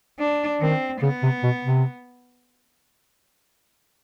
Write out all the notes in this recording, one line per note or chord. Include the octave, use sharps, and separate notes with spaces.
D4
D#3 C4
C#3 B3
C3
B2
C3